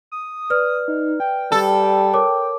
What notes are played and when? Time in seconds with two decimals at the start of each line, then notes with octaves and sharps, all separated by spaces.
0.12 D#6
0.50 B4 D5 F6
0.88 D#4
1.20 G5
1.52 G3 A4
2.14 A#4 C#5 D6